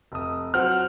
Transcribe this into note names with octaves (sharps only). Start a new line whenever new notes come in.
F1 D#6
F#3 C4 F#5 F6